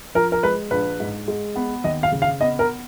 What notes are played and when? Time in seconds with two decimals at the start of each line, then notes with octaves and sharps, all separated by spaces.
0.15 F3 A#4
0.32 A#4
0.43 G#3 B4
0.71 A#1 B4
1.00 G#2
1.28 G#3
1.56 B3
1.84 D#2 D#5
2.03 F5
2.12 C#3
2.22 F5
2.41 B3 D#5
2.59 A#4